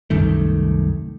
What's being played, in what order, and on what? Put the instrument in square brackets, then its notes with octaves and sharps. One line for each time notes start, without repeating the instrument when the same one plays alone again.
[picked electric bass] C2 F#2 D#3 A3